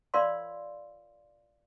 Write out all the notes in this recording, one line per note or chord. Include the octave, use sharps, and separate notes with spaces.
F4 A#4 C#5 D5 F5 C6